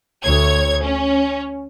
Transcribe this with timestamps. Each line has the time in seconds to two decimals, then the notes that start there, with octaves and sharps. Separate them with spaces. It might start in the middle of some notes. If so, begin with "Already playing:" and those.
0.24 D2 C#5 G#6
0.82 C#4